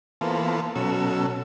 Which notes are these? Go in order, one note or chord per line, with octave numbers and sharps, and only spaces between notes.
E3 A#3 B3 F4 A4 C5
B2 F#3 C#4 A4 E6